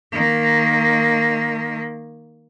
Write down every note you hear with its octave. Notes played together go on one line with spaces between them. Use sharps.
D#3 A#3